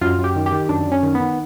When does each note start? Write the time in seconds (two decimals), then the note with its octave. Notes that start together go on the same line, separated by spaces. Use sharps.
0.01 F#2 F4
0.19 F#2
0.24 G4
0.36 D#3
0.46 G4
0.52 D#3
0.69 F#2 D4
0.86 F#2
0.92 C#4
1.03 D#3
1.15 B3
1.20 D#3